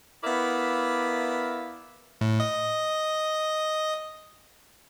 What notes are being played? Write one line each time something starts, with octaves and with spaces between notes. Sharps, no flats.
B3 E4 A#4 D5 E5 F5
A2
D#5